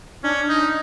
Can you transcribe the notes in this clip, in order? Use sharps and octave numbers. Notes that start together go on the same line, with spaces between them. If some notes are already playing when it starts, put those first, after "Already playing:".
C#4 D4
D#4